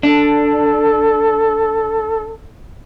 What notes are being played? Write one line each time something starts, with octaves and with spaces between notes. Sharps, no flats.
D4 A4